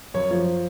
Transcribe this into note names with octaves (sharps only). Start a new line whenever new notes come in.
F#2 C#5
F3